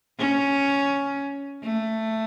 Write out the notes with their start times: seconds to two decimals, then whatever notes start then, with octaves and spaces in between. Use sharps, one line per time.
0.19 C#4
1.64 A3